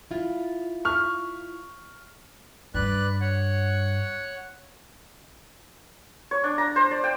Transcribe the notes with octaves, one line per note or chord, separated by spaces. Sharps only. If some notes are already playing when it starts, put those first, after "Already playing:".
E4 F4
C#6 F6
G2 B4 D5 F#6
C#5 F#5
C#5
D4
A#5
C5
D5
G5